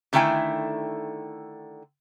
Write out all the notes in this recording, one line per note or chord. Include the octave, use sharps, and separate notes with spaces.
D3 D#3 A3 E4 G5 G#5